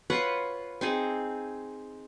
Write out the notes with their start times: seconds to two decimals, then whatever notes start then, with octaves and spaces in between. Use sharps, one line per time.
0.10 F4 B4 C#5 F#5
0.81 C4 D#4 G#4